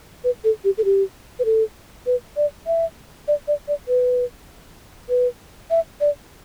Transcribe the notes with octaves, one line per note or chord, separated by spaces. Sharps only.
B4
A4
G4
A4
G4
B4
A4
B4
D5
E5
D5
D5
D5
B4
B4
E5
D5